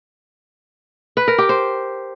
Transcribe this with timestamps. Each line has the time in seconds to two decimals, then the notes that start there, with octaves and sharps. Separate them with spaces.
1.17 B4
1.28 A#4
1.38 G4
1.49 C5